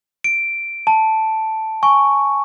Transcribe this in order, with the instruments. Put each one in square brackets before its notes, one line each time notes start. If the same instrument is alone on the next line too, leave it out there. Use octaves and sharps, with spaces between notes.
[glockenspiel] D7
A5
G#5 C#6